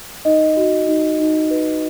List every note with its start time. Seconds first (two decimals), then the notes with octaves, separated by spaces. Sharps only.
0.25 D#4 D#5
0.57 F#4
0.87 D#4
1.20 D#4
1.51 B4